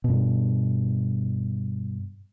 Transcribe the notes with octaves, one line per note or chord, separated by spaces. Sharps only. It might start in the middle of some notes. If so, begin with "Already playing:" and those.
G2 B2